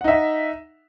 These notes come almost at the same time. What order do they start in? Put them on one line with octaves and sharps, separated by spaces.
F#5 D#4 E5